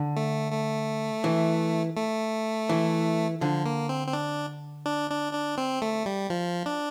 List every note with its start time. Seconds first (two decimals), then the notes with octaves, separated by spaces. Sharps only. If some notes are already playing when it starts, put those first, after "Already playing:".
Already playing: D3
0.16 A3
0.52 A3
1.24 E3
1.97 A3
2.69 E3
3.41 D3 F3
3.65 A#3
3.89 C4
4.07 C4
4.13 D4
4.86 D4
5.10 D4
5.33 D4
5.58 C4
5.82 A3
6.06 G3
6.30 F3
6.66 D4